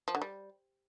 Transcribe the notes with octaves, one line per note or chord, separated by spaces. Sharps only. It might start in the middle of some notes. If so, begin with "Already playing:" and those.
F3
D3
G3